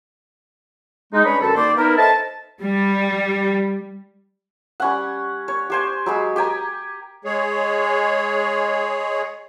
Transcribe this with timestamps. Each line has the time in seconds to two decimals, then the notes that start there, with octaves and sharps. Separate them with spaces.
1.13 G#3 D#4
1.25 C#4 D4 B4 C#5 B5
1.41 F#2 D#3 A4
1.55 D#3 A#3 C5 D5
1.76 B3 D#4 E4 A#4
1.97 A4 C5 D#5 E5 A5
2.58 G3
4.80 G3 C#4 F#5
5.48 C#5
5.70 G4 C5 G#5
6.06 F#3 G#3 B5
6.36 G4 G5 G#5 A#5
7.25 G#3 G#4 C#5